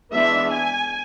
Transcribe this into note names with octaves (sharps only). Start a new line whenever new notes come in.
E3 G#3 B3 D4 E5
G#5